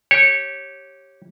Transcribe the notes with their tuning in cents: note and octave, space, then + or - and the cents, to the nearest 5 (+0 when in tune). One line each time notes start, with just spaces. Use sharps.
G4 -10 C#5 -20